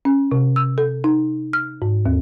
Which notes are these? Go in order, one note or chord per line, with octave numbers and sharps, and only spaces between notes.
C#4
C3
E6
A4
D#4
F6
G#2
D#2